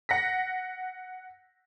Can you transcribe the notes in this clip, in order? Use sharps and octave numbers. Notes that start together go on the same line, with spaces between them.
F#5 A#6 B6